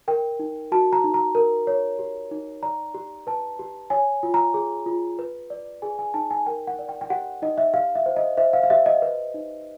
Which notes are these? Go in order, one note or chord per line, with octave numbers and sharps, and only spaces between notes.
A#4 G5
D#4
F#4 A5
A#5
D#4
A#5
A#4
C#5
G4
D#4
D5 A#5
G4
B4 A5
G4
C#5 G#5
F4
A#5
G#4
F4
B4
D5
G#4 G#5
G#5
D#4 A5
G#5
A#4 G5
F#5
D5
G5
G5
G4 F#5
D#4 D#5
E5
G4 F5
E5
C5
D#5
C5 E5
F5
F5
G4 E5
D#5
B4
D#4